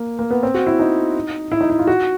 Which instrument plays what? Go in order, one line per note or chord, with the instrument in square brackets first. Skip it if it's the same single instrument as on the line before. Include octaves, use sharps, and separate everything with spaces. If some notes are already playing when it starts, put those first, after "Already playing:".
Already playing: [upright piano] A#3
A#3
B3
C4
F#4
E4
D#4
E4
D#4
E4
F4
F#4